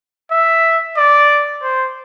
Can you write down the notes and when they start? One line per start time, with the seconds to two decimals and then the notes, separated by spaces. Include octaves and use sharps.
0.31 E5
0.97 D5
1.63 C5